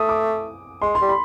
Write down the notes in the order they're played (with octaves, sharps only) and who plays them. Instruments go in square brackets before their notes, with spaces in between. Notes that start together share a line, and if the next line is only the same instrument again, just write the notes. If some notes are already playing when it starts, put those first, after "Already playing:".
Already playing: [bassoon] A3 [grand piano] D#6
[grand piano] D6
[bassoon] G#3 [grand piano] C6
[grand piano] C6
[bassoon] G3
[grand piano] B5